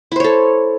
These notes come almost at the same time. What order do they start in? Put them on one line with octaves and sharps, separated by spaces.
E4 C5 C#5 A4